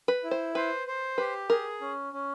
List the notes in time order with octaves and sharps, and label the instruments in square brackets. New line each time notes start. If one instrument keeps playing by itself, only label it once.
[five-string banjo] B4
[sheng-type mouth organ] E4
[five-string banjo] C5
[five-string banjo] B4 [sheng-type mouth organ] C5
[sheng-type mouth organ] C5
[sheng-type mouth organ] G4 [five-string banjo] B4
[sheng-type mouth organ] G#4 [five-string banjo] A#4
[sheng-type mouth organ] C#4
C#4